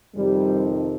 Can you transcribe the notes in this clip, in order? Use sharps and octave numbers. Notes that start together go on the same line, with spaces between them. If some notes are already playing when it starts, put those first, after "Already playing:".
F2 C3 D#3 G3